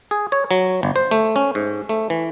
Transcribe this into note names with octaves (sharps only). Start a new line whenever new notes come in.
G#4
C#5
F#3
G1
C5
A3
C#4
G#2
A3
E3